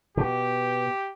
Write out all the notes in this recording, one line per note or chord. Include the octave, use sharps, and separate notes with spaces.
B2 G4